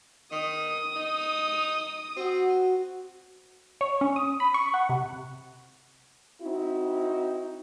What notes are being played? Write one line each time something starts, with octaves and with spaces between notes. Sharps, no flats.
D#3 D#6
D#4
C4 F#4
C#5
C#4
D#6
B5
C#6
F#5
C3
C4 D#4 E4 F#4